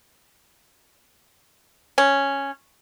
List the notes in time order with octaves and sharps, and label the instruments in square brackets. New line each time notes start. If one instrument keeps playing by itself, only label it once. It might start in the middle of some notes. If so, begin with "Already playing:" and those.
[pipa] C#4